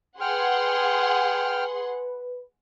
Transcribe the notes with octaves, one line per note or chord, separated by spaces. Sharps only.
G#4 B4 F#5 G5 C6 F6